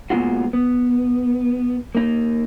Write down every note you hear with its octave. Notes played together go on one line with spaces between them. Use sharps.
A#2 G#3 B3 F4 F#4
B3
A#3 D#4